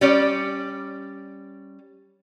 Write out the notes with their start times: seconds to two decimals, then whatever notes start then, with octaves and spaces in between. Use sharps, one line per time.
0.01 G3 C#4 D5